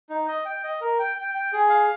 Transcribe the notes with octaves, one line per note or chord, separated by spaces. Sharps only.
D#4
D#5
G5
D#5
A#4
G5
G5
G5
G#4
F5